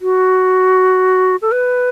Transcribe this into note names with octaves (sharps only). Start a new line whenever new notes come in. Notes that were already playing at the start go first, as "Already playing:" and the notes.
F#4
A4
B4